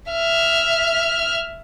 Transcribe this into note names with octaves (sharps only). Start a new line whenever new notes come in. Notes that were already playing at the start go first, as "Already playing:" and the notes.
E5 F6